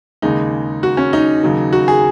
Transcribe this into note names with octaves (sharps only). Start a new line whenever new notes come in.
D#2 C#3 G#3 D#4
F#4
C#4
D#4
D#2 C#3 F#3
F#4
G#4